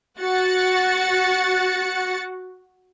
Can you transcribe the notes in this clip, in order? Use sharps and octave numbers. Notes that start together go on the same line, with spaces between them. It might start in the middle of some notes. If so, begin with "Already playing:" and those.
F#4 F#5 A6 C#7